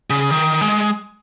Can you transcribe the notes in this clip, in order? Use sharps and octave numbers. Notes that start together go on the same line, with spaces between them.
C#3
D#3
G#3